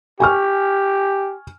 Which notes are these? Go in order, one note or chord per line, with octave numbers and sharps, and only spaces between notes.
G4 G#5 C#6 F6